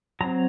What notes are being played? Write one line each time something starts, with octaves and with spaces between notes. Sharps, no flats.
F#3 C4 A#5